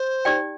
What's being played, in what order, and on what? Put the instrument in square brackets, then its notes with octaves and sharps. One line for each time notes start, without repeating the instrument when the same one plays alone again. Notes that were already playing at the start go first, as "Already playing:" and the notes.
Already playing: [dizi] C5
[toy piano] D#4 G4 D5 G5